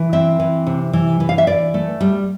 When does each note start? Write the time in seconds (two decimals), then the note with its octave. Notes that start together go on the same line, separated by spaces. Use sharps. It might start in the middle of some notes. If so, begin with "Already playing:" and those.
Already playing: E3
0.13 C4 E5
0.40 E3
0.67 C3
0.93 E3
1.20 E3
1.29 F5
1.38 E5
1.47 E3 D5
1.74 A3
2.01 G3